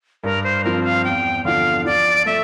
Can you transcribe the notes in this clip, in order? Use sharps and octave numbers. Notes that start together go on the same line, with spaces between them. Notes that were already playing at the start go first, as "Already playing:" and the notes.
G2 A#4
C5
F3 C4 A#4
F5
E2 G5
D3 F3 F5
F3 D5
A3 E5